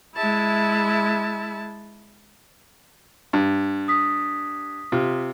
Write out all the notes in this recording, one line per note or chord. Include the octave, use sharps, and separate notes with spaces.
G#3 E4 E5 A5
G2
D#6 B6
C3 F4